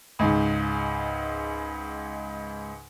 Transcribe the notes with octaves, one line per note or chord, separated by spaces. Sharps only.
C#2 G#2